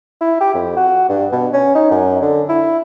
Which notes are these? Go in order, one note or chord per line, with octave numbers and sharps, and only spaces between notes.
E4
G4
F2
F#4
G2
B2
C#4
D#4
F#2
D3
E4